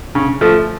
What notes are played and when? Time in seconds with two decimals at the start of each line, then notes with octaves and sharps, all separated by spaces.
0.15 C#3
0.41 F3 A3